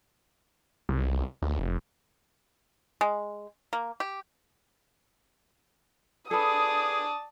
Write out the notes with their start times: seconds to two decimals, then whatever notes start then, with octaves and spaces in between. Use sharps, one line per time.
0.89 C2
1.42 D2
1.59 F1
3.01 G#3
3.73 A#3
4.00 G4
6.31 G#4 A4 B4 D5 A5 D#6